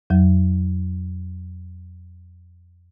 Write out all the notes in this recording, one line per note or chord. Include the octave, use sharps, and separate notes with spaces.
F2 F#3